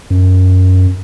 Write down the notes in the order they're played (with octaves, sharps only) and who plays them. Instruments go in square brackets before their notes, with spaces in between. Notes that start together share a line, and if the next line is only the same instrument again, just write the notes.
[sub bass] F#2